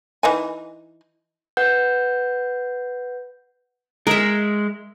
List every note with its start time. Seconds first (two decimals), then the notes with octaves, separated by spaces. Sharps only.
0.23 E3 D#4 G#5
1.57 B4 F#5 G6
4.07 G#3 A#4 E5